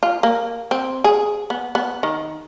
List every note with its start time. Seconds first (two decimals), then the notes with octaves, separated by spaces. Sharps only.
0.03 F4
0.23 A#3
0.71 C4
1.04 G#4
1.50 B3
1.75 B3
2.03 D#3